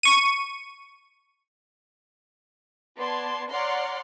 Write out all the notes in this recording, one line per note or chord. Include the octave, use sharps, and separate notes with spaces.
C#6 D#7
B3 D5 A5 C6 G#6
C#5 D5 F#5 A#5 C6 F6